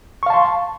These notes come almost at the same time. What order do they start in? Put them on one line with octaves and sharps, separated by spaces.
C#6 F5 A5 C6